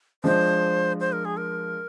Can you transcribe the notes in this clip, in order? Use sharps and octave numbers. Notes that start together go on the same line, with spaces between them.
F3 G#3 D4 C5
C5
A#4
G#4
A#4